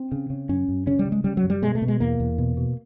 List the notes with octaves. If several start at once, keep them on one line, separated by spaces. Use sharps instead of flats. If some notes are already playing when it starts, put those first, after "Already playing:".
Already playing: C4
C#3
C#3
F#2 C#4
F#2
C#3 C#4
G3
C#3
G#3
C#3 G3
F#3
F#2
G3
B2 G#3
A3
B2
G#3
E2 A#3
E2
B2
B2